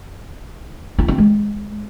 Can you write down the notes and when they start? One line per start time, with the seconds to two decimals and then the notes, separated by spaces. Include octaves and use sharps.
0.98 F4
1.08 C4
1.18 G#3